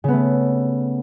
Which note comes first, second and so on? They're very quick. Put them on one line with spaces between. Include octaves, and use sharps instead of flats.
C#3 B3 A3